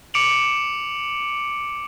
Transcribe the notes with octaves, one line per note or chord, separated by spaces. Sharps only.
D6 C#7 D7 F7 F#7